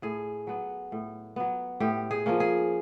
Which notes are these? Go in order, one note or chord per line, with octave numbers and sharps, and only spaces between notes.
A2 G#4
F#3 B3
A2
F#3 B3
A2 G4
G#4
F3 A#3 C#4
G#4